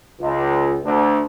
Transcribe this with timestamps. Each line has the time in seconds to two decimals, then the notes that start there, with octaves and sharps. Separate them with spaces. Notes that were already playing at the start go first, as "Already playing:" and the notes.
0.20 C#2
0.84 D2